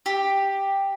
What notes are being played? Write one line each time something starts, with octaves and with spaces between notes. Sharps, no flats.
G4